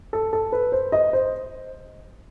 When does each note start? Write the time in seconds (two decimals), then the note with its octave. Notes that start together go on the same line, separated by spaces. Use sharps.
0.13 A4
0.33 A4
0.52 B4
0.72 C5
0.92 D#5
1.13 C5